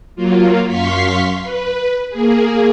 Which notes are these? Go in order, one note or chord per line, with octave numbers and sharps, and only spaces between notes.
F#3 A#3 F4
F#2 F5 C6 C#6 B6
B4
A#3 G#4